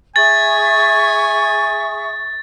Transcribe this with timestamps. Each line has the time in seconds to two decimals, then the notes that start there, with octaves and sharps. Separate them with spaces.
0.16 G#4 E5 G#5 C#6 A6